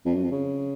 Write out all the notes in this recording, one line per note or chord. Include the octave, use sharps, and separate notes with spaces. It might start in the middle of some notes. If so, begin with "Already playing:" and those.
F2
F#2
F2
C#3